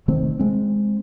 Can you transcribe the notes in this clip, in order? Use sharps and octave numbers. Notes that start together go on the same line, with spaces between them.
C3 D#3 A3 C4
G#3 C4